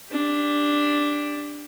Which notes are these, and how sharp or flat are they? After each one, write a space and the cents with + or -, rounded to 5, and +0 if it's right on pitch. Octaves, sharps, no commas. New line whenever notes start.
D4 +0 G4 +25